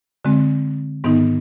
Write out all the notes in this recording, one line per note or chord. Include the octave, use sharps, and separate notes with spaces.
D3 G#3 C4
G#2 D#3 B3 D#4